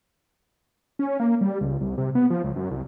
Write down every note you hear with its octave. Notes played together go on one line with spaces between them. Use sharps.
C#4
A#3
G3
C#2
C2
C3
B3
F3
C#2
F#2
C2